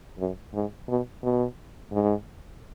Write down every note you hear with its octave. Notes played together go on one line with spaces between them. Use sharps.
F#2
G#2
B2
B2
G#2